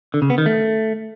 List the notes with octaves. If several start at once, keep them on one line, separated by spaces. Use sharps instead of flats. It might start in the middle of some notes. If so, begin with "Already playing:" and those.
D3
C#3
B3
D#3
A3